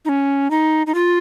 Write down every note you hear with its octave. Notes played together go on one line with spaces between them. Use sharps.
D#4
C#4
D#4
D#4
F4